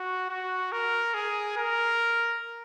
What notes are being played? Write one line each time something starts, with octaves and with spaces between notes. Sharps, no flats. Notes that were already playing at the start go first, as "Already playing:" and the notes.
Already playing: F#4
F#4
A#4
G#4
A#4